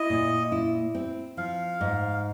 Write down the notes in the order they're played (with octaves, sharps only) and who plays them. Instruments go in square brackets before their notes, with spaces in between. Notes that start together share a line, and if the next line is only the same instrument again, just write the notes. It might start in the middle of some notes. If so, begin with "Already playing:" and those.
Already playing: [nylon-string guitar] E4 [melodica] D#5
[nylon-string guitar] A#2
E4
C4
[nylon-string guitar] F3 [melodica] F5
[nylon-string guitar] G#2